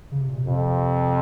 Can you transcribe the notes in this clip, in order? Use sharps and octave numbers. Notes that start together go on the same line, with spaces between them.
C#3
C3
A#2
C3
F2